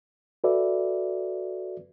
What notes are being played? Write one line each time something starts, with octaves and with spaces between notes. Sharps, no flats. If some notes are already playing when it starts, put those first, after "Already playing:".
F#4 A4 B4 D5 E5